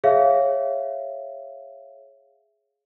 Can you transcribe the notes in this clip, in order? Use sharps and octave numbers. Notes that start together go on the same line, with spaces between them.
G#4 C#5 E5 F5